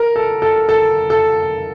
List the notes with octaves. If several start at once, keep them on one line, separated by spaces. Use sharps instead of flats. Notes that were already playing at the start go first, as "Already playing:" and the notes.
Already playing: A#4
A4
A4
A4
A4